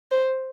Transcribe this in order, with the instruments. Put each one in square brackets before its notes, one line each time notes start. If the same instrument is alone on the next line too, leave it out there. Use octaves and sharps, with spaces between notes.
[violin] C5